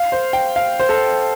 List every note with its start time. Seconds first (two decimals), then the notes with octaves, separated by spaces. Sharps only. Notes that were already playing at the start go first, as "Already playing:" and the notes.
Already playing: F5
0.12 C5
0.33 G5
0.56 F5
0.79 C5
0.89 A4